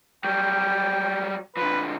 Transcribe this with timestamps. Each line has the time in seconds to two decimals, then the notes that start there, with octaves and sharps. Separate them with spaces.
0.25 F#3 G3 G5
1.57 D3 F3 B4